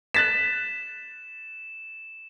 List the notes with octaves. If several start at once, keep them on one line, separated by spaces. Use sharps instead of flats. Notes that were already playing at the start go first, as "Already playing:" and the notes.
F#6 A6 B6 E7